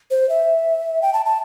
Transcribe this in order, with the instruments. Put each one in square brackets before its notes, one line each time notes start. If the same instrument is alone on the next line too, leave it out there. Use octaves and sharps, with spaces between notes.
[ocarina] C5
E5
G5
A5
A5